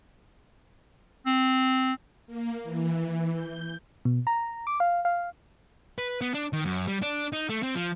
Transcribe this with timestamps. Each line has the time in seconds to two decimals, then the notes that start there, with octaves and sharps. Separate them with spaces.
1.26 C4
2.27 A#3
2.63 E3
3.34 G6
4.05 B2
4.27 A#5
4.67 D6
4.80 F5
5.05 F5
5.98 B4
6.21 B3
6.34 D4
6.53 D#3
6.65 F#2
6.88 G3
7.02 D4
7.33 D#4
7.49 A3
7.63 C4
7.75 F3